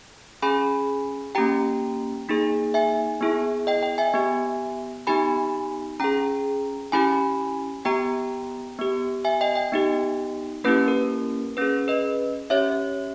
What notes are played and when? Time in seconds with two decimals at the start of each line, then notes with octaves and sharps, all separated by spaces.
0.42 C#4 G#4 G#5 B5
1.35 A#3 C#4 G4 G5 A#5
2.28 A#3 D#4 G#4
2.74 E5 G#5
3.21 B3 E4 G#4
3.67 D#5 G5
3.83 D#5 G5
3.98 E5 G#5
4.14 B3 G4
5.07 B3 D#4 G4 G#5 B5
6.00 C#4 G#4 G5 A#5
6.92 C#4 E4 G4 G#5 B5
7.85 B3 G4 G5 A#5
8.79 B3 G4
9.25 E5 G#5
9.41 D#5 G5
9.55 D#5 G5
9.72 B3 D#4 G4
10.64 A#3 C#4 E4 G4 B4
10.88 A#4
11.57 C#4 G#4 B4
11.88 B4 D#5
12.50 C#4 G4 C#5 E5